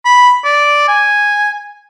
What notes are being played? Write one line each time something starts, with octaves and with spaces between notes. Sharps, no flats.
B5
D5
G#5